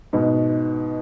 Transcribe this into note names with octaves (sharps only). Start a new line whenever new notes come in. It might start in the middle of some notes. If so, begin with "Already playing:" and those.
G#2 B2